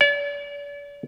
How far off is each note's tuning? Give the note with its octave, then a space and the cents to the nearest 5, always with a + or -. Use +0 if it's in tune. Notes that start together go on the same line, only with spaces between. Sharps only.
D5 -40